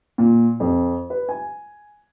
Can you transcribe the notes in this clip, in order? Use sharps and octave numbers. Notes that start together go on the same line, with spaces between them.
A#2
F2
B4
G#5